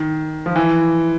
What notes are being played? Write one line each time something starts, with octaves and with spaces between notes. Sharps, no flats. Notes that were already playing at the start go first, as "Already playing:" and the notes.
Already playing: D#3
F3
E3